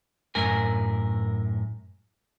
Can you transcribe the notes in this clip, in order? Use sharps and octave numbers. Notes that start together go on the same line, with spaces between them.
F#2 A2 A#4 G#5